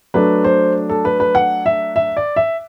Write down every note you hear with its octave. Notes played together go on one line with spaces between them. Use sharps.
F#3 A3 D4 B4
C5
A4
B4
B4
F#5
E5
E5
D5
E5